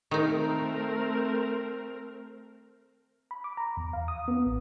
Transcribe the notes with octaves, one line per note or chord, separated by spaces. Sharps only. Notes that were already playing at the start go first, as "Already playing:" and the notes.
D#3 A3 C4 D#4 A#4
B5
D6
A#5
E2
F5
D#6
B3
A1